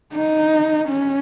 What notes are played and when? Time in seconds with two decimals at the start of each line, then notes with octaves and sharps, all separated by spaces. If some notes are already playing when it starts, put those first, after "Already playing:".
0.13 D#4
0.89 C#4